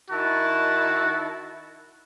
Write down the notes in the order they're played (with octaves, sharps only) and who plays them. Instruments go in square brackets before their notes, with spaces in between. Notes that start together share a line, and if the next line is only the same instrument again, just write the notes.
[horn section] D#3 E4 A5 [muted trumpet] F#4